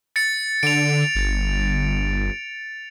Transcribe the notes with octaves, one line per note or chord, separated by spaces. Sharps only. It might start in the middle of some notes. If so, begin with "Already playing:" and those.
A6 C#7
D3 D7 F7
G1